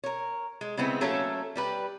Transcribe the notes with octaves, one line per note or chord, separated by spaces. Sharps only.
A#4 C#5
G#3
C#3 G#3 B3 C4 E4
F#3 A3 A#3 C#4 A4
G3 G4 B4